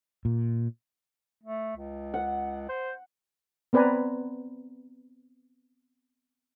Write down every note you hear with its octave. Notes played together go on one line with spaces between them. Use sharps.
A#2
A3
C#2
F#5
C5
B3 C4 B4 D5 G#5 A#5